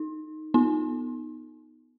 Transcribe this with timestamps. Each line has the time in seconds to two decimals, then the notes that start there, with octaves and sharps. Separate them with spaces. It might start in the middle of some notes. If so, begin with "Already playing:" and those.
Already playing: D#4
0.54 B3 D#4